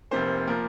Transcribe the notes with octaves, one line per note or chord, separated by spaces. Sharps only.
F1 F2 C3 A#3 C5
A#2 F3 A#3 A#4